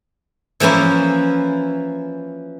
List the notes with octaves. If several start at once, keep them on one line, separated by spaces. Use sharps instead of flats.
E3 F3 A#3 C#4 E4